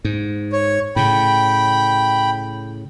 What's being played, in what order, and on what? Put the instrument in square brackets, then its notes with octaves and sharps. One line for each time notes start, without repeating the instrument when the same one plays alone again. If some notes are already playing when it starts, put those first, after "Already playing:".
[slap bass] G#2
[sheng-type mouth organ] C#5
[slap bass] A2 C#3 [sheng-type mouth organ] G5 B5